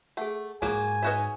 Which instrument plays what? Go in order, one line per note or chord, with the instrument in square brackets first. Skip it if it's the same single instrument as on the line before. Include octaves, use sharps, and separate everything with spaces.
[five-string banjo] A3 [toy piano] G#4 F#5
[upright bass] G#2 [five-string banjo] F3 F#3 A#3 [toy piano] G#4 D6 [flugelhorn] G#5
[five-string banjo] D#4 F#4 E5 [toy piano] B4 C#5